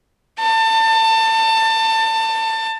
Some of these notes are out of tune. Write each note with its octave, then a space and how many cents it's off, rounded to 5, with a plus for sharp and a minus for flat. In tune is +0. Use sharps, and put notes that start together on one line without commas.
A5 +25